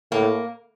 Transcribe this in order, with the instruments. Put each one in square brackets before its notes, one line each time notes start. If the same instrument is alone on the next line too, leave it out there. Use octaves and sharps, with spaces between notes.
[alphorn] A2 [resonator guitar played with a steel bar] A#3